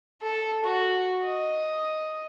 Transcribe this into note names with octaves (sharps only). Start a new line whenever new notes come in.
A4
F#4
D#5